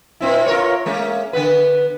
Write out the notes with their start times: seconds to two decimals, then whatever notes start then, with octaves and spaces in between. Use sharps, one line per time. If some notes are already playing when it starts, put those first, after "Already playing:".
0.20 A#2 C4 E4
0.46 F4 A#4 C#5
0.86 G#3 A#3 C#4
1.33 D3 B3 B4